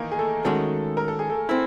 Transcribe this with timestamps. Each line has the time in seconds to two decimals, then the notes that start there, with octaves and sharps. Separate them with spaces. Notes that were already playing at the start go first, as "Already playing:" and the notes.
Already playing: D#3 E3 A#3 D#4 A#4
0.12 G#4
0.19 A3 A4
0.45 D#3 G#3 A3 C#4 F#4 A4
0.97 A#4
1.08 A4
1.19 G#4
1.30 A3 A4
1.49 C4 E4